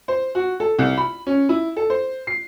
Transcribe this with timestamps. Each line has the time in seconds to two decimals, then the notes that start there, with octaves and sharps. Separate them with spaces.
0.08 C5
0.35 F#4
0.60 A4
0.79 C2
0.98 B5
1.27 C#4
1.49 E4
1.77 A4
1.90 C5
2.27 C7